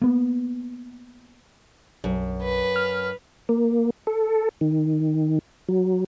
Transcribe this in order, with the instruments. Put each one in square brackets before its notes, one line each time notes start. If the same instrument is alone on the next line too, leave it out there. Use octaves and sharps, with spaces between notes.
[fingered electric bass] A#3 B3
[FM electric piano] B1 [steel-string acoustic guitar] F#2
[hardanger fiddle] B4
[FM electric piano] F6
[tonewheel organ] A#3
A4
D#3
F#3